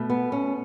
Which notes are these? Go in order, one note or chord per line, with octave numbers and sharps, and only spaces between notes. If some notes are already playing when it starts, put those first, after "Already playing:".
Already playing: B2 A3
B3
C#4